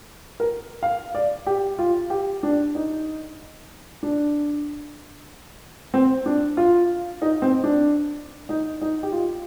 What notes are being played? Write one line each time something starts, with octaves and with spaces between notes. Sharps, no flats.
A#4
F5
D5
G4
F4
G4
D4
D#4
D4
C4
D4
F4
D#4
C4
D4
D#4
D#4
G4
F4